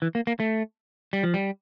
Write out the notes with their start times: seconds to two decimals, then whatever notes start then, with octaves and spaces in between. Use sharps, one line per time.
0.02 E3
0.15 A#3
0.27 A#3
0.40 A3
1.13 G3
1.23 F3
1.34 G3